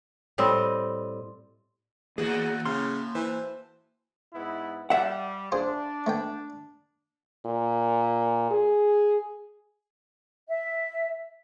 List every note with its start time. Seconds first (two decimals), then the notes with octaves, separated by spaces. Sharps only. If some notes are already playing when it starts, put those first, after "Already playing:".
0.38 A2 G3 C4 D#5
2.18 D#2 E3 A#3 F#4 G#4
2.65 A2 C#3 C6 F6
3.15 E3 C5
4.33 G#2 B3 E4
4.90 G3 E5 F#5
5.52 D4 F4 G#4 C5
6.07 A3 B3 G5
7.46 A#2
8.51 G#4
10.48 E5